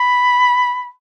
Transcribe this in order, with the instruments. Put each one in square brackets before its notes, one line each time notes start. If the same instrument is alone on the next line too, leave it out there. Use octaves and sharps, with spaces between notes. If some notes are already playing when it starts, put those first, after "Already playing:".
Already playing: [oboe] B5